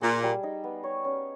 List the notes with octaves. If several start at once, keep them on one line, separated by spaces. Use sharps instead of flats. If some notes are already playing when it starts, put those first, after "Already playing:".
A#2 G#4
G3
D#4
B3
C#5
C#4